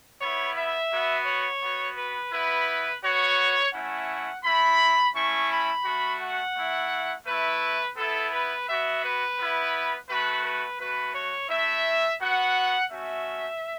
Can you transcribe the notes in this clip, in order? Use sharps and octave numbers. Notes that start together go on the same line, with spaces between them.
B3 E4 C#5
E5
B3 F#4
C#5
B3 F#4
B4
B3 E4 B4
B3 F#4 C#5
A3 C#4 E4 F#5
A3 E4 B5
A3 C#4 E4 C#6
B5
A3 F#4
F#5
A3 E4
A3 E4 B4
B3 E4 A4
B4
B3 F#4 E5
B4
B3 E4
A3 F#4 B4
B4
A3 F#4 B4
C#5
A3 E4 E5
B3 F#4 F#5
A3 C#4 F#4 E5